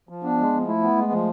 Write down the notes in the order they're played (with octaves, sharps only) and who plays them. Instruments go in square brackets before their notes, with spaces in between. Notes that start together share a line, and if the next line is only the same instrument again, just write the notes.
[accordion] F3
[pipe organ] B3 [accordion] D4
[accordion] G#3
F3
[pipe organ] A3 [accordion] E4
[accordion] B3
G#3
F3